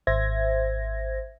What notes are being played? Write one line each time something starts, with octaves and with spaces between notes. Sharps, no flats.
G#1 C5 E5 G#6 A#6